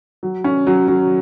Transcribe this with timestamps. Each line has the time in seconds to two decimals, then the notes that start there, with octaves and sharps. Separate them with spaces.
0.23 F#3
0.44 C#4
0.67 F#3
0.88 F#3